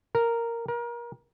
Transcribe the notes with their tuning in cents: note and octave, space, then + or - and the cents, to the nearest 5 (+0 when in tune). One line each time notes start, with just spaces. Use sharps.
A#4 -5
A#4 +30